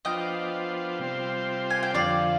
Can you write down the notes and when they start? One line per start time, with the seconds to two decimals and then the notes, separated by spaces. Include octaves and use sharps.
0.05 F3 B3 D4 F4 C5 D#5 G5
0.99 C3 G3 C4 F4 C5
1.70 G#5
1.83 G5
1.94 F2 D3 F3 D5 F5